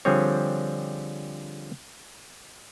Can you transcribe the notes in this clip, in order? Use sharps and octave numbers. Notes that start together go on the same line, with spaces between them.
D3 F3 G3 C4 G#4 C#5